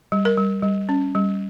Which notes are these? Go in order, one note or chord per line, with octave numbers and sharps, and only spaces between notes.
G3
A#4
G3
G3
C#4
G3